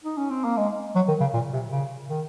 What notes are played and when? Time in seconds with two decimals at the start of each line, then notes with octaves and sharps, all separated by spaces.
0.05 D#4
0.18 C#4
0.31 C4
0.45 A#3
0.57 G#3
0.96 F#3
1.09 D#3
1.21 C#3
1.34 A#2
1.53 C3
1.72 C#3
2.10 D#3